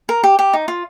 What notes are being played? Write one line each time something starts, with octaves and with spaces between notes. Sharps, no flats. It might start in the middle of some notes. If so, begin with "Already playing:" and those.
A#4
G4
G4
D#4
F4